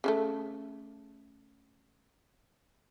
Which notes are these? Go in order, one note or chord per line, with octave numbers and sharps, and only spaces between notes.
C#3 G3 A3